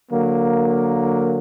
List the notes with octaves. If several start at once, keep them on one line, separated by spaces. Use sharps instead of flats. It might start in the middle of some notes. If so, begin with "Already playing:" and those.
D3 F#3 A#3